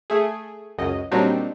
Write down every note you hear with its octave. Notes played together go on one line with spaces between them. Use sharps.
A3 G#4
C#2 F#2 D#5
A#2 F#3 G3 C4 D4 D#4